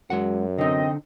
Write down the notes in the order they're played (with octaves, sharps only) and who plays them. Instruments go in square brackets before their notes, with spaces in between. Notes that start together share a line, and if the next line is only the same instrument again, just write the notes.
[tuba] F#2 [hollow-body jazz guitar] G#3 F#4 F#5
[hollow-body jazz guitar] D3 D#4 [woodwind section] C4 D#5